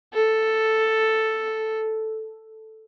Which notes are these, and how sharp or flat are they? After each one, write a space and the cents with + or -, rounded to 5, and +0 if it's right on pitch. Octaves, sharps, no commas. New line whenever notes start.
A4 +0